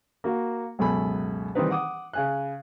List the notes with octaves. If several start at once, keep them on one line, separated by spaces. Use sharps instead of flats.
A#3 F#4
C#2 F#2 B2 A4 G#5 B5
D#3 E3 G3 C4 D#4 B4
F#5 D6 D#6
C#3 G#5 F#6